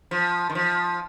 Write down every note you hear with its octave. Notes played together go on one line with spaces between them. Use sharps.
F3
D#3
F3